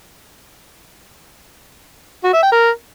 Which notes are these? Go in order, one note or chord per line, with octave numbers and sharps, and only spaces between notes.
F#4
E5
G5
A#4